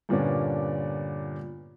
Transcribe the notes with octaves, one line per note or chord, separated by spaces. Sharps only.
G2 A#2 D3 B3 C#4 D4